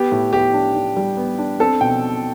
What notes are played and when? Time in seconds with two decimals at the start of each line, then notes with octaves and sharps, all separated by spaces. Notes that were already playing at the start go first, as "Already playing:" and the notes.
Already playing: B3 G4
0.12 A2
0.33 B3 G4
0.54 D4
0.75 D4
0.97 G3
1.17 B3
1.38 D4
1.60 C4 A4
1.81 B2 G5